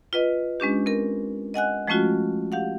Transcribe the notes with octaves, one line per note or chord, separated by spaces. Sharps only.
F4 B4 D#5
G#3 C#4 D4 G4
C4 A#4
D#5 F#5 G#5 F#6
F3 G#3 A3 C#4 F4 F#4
G4 F5 F#5